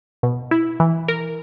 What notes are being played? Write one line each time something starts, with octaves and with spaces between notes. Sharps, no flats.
B2
E4
E3
A#4